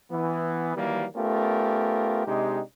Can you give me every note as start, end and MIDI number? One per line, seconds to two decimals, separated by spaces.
0.11 0.73 52
0.11 0.73 59
0.76 1.05 51
0.76 1.05 52
0.76 1.05 54
0.76 1.05 55
0.76 1.05 58
1.16 2.23 57
1.16 2.23 59
1.16 2.23 61
1.16 2.23 65
1.16 2.23 67
1.16 2.23 70
2.26 2.61 48
2.26 2.61 56
2.26 2.61 62
2.26 2.61 63
2.26 2.61 67